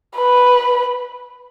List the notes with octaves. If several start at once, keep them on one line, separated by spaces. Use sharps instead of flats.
B4